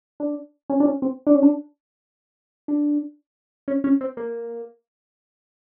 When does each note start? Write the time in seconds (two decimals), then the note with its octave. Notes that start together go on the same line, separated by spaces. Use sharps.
0.20 D4
0.70 C#4
0.80 D4
0.85 C#4
1.02 C4
1.27 D4
1.35 C#4
1.43 D4
2.68 D4
3.68 C#4
3.84 C#4
4.01 C4
4.17 A#3